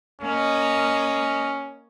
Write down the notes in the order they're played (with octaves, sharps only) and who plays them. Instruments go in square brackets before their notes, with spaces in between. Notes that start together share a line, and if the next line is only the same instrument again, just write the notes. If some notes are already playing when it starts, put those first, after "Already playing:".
[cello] A#3 D#5 [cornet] C#4